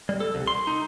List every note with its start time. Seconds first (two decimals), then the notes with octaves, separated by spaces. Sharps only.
0.09 G3
0.20 A4
0.35 C2
0.48 C6
0.67 D#4